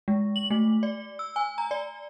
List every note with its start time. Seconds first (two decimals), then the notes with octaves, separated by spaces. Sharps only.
0.08 G#3
0.36 F#7
0.50 A3
0.83 D5
1.19 E6
1.36 G#5
1.58 A#5
1.71 D5